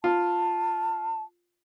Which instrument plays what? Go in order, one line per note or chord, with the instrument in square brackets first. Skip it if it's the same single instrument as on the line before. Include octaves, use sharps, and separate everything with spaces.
[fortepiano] F4 [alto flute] A5